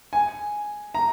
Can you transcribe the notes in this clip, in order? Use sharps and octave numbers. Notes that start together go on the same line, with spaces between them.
G#5
A#5